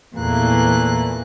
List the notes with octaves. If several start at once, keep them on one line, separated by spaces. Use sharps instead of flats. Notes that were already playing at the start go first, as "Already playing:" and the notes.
E2 A#2 E3 A3 A#3 F#6